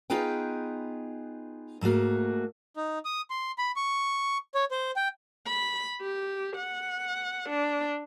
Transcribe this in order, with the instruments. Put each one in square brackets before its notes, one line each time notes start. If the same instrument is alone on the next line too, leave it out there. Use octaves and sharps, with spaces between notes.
[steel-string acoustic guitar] B3 D#4 F4 G#4 B4 G5
G#2 A3 A#3 F#4
[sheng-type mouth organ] D#4
D#6
C6
B5
C#6
C#5
C5
G5
[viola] B5
G4
F#5
D4